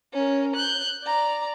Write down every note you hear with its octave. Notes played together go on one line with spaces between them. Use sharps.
C#4 A#4
F#6 G6
D5 A#5